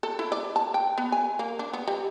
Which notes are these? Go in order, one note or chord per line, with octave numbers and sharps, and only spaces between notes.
A4
E4
D5
A5
G5
B3
G#5
A#3
D4
B3
G3